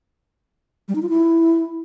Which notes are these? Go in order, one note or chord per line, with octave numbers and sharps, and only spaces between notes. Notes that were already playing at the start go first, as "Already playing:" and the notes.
G3
D#4
F4
E4